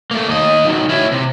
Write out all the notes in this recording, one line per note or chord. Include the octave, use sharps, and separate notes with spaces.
A3 A#3
D#2 D#5
D#3 F#3
C#4 E4
C3